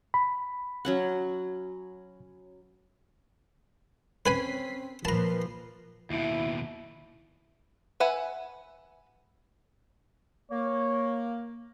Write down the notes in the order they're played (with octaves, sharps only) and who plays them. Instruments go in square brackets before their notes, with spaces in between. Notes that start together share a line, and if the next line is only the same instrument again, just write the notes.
[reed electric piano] B5
[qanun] F#3 C#4 F#5
[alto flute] C4 [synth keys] C#4 B6 C7 [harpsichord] B4 G#5 B5
[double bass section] A#2 F3 [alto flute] A#4 [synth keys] B4 C7 [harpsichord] A5 A#5
[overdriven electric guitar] D#2 B2 [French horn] E4
[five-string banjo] B4 E5 F#5 G#5
[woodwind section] A#3 [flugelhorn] C#5